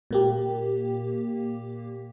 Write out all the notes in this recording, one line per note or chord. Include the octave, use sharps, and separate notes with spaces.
A#2 A#3 G4